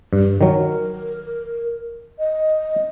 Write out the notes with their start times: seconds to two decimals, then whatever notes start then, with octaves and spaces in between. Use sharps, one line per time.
0.13 G2
0.41 D#3 F#3 A#4
2.19 D#5